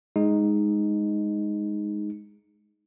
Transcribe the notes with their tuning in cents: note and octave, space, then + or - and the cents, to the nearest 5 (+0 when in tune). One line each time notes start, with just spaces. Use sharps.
G#3 +0 D#4 +0